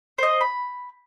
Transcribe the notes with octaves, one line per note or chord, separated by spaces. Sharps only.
C5 D#5
B5